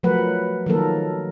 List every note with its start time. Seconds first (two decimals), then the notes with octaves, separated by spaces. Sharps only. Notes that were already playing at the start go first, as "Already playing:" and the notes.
0.03 F3 F#3 A3 A#4 B4 F#5
0.66 D#3 F3 F#3 A#3 A4 A#4